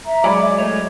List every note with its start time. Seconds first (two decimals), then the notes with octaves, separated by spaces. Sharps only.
0.05 E5 A#5
0.24 F#3 G#3 D5 E5 G#5 B5 D6
0.58 A3 C#5 D#5